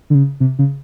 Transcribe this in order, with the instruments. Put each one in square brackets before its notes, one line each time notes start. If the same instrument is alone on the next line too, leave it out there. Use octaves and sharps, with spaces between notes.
[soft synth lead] D3
C#3
C3
C#3